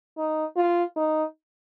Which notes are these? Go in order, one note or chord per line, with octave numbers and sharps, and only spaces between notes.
D#4
F4
D#4